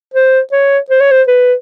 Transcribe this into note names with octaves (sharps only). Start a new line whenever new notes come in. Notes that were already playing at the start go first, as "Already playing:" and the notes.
C5
C#5
C5
C#5
C5
B4